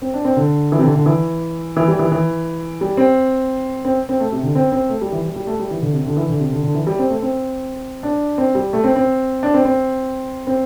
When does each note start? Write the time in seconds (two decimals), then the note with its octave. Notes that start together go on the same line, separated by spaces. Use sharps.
0.02 C4
0.14 D4
0.25 C4
0.37 D3
0.72 E3
0.78 C3
0.83 D3
0.95 D3
1.06 E3
1.76 E3
1.88 G3
1.99 E3
2.12 E3
2.81 G3
2.97 C4
3.85 C4
4.09 C4
4.20 A3
4.32 C3
4.43 D3
4.55 C4
4.72 C4
4.89 A3
5.01 G3
5.12 E3
5.24 G3
5.36 G3
5.47 A3
5.59 G3
5.71 E3
5.82 D3
5.93 C3
6.06 D3
6.17 E3
6.29 D3
6.40 C3
6.52 D3
6.63 D3
6.75 E3
6.87 G3
6.99 C4
7.10 A3
7.22 C4
8.03 D4
8.38 C4
8.55 G3
8.73 A3
8.84 C4
8.96 C4
9.43 D4
9.54 C4
9.65 C4
10.47 C4